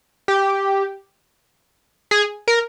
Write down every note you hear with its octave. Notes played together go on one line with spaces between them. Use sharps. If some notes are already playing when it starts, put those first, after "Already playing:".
G4
G#4
A#4